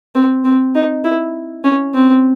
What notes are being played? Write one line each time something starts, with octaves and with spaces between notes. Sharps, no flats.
C4
C4
D#4
E4
C#4
C4